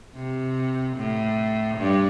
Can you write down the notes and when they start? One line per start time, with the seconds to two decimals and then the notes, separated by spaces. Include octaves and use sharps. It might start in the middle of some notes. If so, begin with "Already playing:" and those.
0.16 C3
0.97 A2
1.78 G2